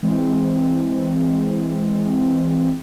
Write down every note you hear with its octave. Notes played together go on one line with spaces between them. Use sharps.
E3 G#3 C4